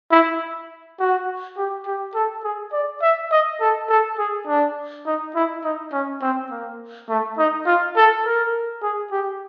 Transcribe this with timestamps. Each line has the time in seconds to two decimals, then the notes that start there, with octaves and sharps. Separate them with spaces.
0.11 E4
1.00 F#4
1.57 G4
1.86 G4
2.15 A4
2.44 G#4
2.73 D5
3.02 E5
3.32 D#5
3.61 A4
3.89 A4
4.18 G#4
4.47 D4
5.06 D#4
5.35 E4
5.64 D#4
5.93 C#4
6.22 C4
6.50 A#3
7.09 A3
7.38 D#4
7.66 F4
7.96 A4
8.26 A#4
8.83 G#4
9.12 G4